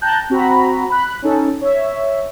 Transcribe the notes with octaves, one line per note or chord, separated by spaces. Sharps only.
G5 A5 A#5 F#6 G6
C4 F#4 A#5 B5
B5 F#6
C#4 D#4 A4
C#5 E5